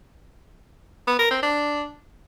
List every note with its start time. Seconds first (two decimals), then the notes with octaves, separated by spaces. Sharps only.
1.07 B3
1.19 A#4
1.31 C4
1.43 D4